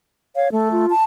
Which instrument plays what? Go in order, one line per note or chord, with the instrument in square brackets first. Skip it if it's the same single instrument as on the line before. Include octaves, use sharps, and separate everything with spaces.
[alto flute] C#5 [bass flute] F5
[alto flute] A3 [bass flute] A4
[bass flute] F4
[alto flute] A5